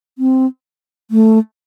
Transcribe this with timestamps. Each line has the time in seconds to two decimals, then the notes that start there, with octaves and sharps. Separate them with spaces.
0.18 C4
1.11 A3